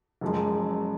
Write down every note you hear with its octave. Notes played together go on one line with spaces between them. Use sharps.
F#1 F#2 F3 G#3